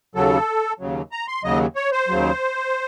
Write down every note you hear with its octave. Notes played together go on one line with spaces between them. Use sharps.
D#2 C#3 F#3 A4
D#2 C#3 F#3
A#5
C6
D#2 C#3 F#3 D#5
C#5
C5
D#2 C#3 F#3